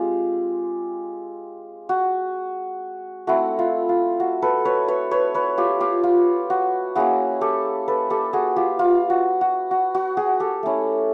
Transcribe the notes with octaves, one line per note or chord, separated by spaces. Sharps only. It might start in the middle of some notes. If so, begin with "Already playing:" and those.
Already playing: G#3 C4 F4 G4
F#4
A3 C4 E4 F#4
F4
F4
F#4
A4 B4
B4 C#5
B4 C#5
B4 C#5
B4 C#5
F4 G4
F4 G4
F4
F#4
A#3 C#4 E4 F#4 G#4
G4 A4
A4 B4
G4 A4
F#4 G#4
F4 G4
F4
F#4
F#4
F#4
F#4
F#4 G#4
G4 A4
A3 C#4 E4